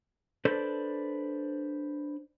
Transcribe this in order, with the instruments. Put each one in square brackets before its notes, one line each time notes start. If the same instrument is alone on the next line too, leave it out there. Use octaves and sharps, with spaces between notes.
[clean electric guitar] D4 A4 B4 C5 D5